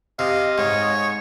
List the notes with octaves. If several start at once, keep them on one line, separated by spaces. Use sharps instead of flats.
C3 D#5 F5
G#2 C#5